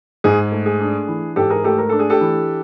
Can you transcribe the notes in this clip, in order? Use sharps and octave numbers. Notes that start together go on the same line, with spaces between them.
G#2 G#4
A3
G#4
D4
E3
G#2 G4 A4
G#4 A#4
A3 G4 A4
A#4
D4 A4
G#4
G4 A4
E3